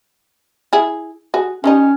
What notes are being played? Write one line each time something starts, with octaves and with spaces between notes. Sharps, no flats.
E4 G#4
F#4 G#4
D#3 G3 C#4 D#4